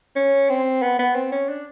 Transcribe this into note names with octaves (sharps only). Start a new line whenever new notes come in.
C#4
C4
B3
B3
C4
C#4
D4